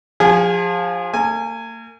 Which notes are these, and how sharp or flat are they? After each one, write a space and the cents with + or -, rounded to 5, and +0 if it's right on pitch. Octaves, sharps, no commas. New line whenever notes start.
F3 +20 G#4 -30 G#5 +15
A#3 -40 G#5 +0